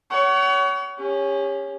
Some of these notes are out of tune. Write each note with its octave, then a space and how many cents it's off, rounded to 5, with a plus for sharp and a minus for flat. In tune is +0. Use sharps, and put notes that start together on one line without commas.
C#5 +25 F#5 +35
C#4 +0 G4 +40